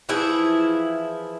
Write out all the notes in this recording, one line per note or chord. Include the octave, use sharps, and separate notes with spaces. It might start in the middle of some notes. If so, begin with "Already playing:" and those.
E3 F3 E4 G#4